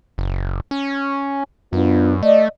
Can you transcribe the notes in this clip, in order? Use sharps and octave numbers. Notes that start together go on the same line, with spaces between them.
F#1
C#4
F#2 B3 D4 F4
A3 D5 D#5